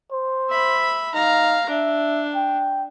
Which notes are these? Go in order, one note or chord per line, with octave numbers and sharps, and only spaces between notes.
C5
E5 B5
D#4 F5 A#5
D4 E5
G5